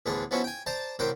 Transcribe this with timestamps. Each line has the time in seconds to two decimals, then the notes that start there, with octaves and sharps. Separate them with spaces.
0.06 A1 D2 B3 D4 G#4
0.31 F3 F#3 B3 C#4 E4 F#4
0.44 G5 G#5
0.66 C5 D5 A5 A#5
0.99 A1 C3 F#3 A#4 C5 G5